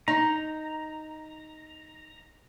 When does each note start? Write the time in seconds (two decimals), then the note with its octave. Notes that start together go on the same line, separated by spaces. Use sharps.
0.08 D#4 A#5